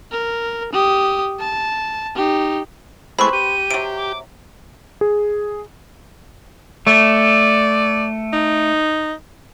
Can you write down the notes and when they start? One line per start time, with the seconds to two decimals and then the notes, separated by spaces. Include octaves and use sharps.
0.12 A#4
0.73 G4 D#6
1.40 A5
2.15 D#4 G4
3.19 G#3 A3 C4 E4 B4 B5 C#6
3.33 G4 D#7
3.71 C3 F#3 D7
3.97 D6
5.01 G#4
6.87 A3 D5
8.33 D#4